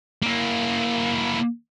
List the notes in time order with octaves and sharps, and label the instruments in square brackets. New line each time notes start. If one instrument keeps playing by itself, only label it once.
[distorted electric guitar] A#3 E4